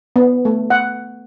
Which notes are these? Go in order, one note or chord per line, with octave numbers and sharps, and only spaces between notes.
B3
A3
F#5